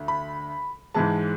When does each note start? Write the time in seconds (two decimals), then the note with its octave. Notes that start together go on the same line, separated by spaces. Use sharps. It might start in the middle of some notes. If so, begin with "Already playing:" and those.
Already playing: D2
0.08 B5
0.94 G#2 E3 G#3 A5